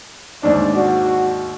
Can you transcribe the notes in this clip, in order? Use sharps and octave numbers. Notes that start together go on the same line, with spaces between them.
D#2 G#2 D4 D5
F#4